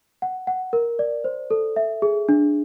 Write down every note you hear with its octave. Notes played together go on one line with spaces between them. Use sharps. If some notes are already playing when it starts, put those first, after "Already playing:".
F#5
F#5
A#4
D5
C5
A4
E5
G#4
D4